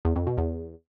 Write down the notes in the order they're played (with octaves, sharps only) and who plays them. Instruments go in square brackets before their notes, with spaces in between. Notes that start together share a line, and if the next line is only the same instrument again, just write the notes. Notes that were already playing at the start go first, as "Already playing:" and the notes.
[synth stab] E2
F2
B2
E2